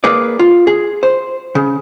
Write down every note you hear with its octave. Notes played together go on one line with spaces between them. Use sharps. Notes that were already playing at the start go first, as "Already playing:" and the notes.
A#3 G#4 B4 D5
F4
G#4
C5
C#3